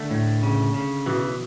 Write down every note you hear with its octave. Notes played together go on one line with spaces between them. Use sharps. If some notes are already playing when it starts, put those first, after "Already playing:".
Already playing: D3 A3
A2
C#3
C#3
B2 E3